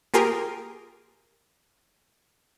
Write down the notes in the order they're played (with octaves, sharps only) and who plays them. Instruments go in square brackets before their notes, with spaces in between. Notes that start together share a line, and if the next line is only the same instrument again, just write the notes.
[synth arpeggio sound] A#3 F4 G4 G#4 A#4